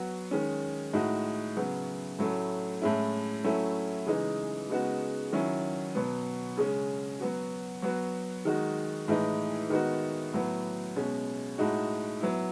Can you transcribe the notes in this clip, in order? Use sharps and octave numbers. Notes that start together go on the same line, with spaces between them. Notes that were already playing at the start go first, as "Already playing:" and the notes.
Already playing: F#3 B3 F#4
D#3 G#3 C#4
A2 G#3 D#4 F#4
C#3 F#3 B3
A2 F#3 A3 C#4 E4
A2 G#3 C#4 E4
F#3 A3 C#4 E4
C#3 E3 G#3 D#4
C#3 G#3 B3 D#4 F#4
D#3 F#3 C#4 E4
B2 F#3 B3
C#3 G#3 C#4
F#3 B3 F#4
F#3 B3 F#4
D#3 G#3 D#4 F#4
A2 E3 G#3 D#4
D#3 G#3 B3 D#4 F#4
A2 F#3 B3
B2 G#3 C#4
A2 G#3 D#4 F#4
F#3 B3 E4